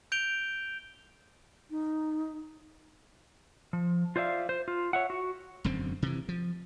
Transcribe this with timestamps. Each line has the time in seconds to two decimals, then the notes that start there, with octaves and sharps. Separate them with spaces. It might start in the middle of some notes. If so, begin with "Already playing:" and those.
0.12 G6 D7 F7 G7
1.71 D#4
3.73 F3
4.16 F4 C5 D5 E5 F5
4.49 C5
4.68 F4
4.93 C#5 E5 F#5
5.10 F#4
5.64 E1 F#2 D3 C4
6.02 C3 E3
6.29 F3